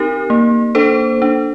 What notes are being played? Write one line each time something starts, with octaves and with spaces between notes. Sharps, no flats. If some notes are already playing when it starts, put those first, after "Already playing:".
Already playing: C4 D#4 G4 A#4
A#3
D4 A4 C5
D4